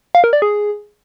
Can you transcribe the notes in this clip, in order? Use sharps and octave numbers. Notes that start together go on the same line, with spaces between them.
F5
A#4
D5
G#4